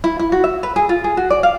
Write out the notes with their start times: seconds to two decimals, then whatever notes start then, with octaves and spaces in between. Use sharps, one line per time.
0.04 E4
0.19 E4
0.32 F#4
0.44 E5
0.63 B4
0.76 G#4
0.89 F4
1.04 G#4
1.17 F#4
1.30 D5
1.43 F5